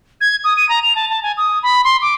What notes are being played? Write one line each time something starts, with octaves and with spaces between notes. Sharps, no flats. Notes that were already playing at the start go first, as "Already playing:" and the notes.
G#6
D#6
D#7
A#5
F7
A5
A5
G#5
D#6
B5
C6
D6